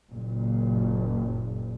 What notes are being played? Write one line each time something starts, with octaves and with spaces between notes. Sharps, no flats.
F#1 A#2